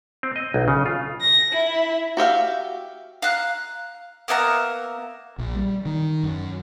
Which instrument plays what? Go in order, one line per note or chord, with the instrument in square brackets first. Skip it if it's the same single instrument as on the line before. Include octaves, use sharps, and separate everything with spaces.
[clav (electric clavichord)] C4
D#5
B1
C#3
F4
[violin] A#6
E4
[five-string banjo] F#4 G4 E5 F5
[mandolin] F5 A#5 F#6
A#3 B3 E5 A#5
[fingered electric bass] A#1
G3
D#3
F#2